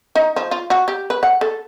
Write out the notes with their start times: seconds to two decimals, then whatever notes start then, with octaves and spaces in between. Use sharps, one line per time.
0.15 D#4
0.36 F3
0.51 F4
0.70 F#4
0.88 G4
1.10 B4
1.23 F#5
1.41 A4